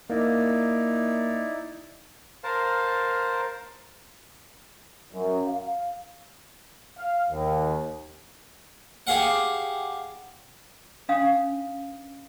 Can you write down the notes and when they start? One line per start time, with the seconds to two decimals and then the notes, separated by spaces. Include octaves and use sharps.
0.10 A#3 D#4 E4 D5
2.44 A#4 C5 F5 A5
5.12 F#2
5.47 F5
6.98 F5
7.30 D#2
9.07 G4 G#4 F5 F#5
11.09 C#4 D4 F5 D#6